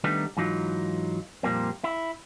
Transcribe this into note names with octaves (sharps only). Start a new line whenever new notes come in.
D#3 G3 A3 B3 D4 D#4
G#2 E3 F#3 D#4 F4
F2 A#2 G3 A#3 C4
E4